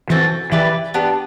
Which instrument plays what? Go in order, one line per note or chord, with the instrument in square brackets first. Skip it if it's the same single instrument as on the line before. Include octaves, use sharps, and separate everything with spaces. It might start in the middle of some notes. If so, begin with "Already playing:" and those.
[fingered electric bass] E3 [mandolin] C4 F#4 A4
[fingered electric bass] E3 [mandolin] E4 G4 B4 D5
[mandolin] B3 D4 G4